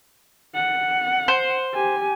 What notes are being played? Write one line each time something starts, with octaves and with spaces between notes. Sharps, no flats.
F#5
C5
G4 G#5